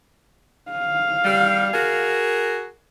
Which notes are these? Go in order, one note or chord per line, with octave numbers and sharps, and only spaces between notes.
F5
G3
F#4 G#4 A#4